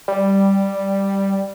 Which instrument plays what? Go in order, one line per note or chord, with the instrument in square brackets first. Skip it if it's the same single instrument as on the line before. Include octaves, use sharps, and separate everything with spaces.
[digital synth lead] G3